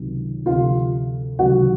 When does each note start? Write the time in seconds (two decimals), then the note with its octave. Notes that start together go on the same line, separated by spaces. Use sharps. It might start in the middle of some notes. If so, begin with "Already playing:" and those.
Already playing: C#2 C3 D#3 F#3
0.46 D2 C3 F3 F4 F5
1.38 C#2 C3 D#3 F#3 F#4 F#5